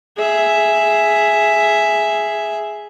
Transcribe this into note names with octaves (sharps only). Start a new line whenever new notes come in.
G#4 E5